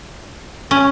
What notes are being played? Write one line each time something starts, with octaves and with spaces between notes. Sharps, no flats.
C#4